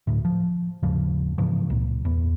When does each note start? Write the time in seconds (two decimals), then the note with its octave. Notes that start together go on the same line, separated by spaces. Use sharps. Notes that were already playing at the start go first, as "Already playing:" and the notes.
0.07 D2 A2
0.25 F3
0.83 D#2 G#2 C#3 F3
1.38 G#2 C#3 E3 F3
1.70 C#2 A#2
2.05 E2 B3